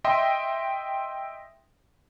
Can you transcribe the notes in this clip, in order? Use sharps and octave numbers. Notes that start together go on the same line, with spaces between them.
D#5 E5 G5 C6